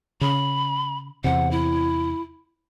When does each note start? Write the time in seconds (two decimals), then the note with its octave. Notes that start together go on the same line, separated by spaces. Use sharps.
0.21 C#3 B5
1.24 E2 C3 F#5
1.51 E4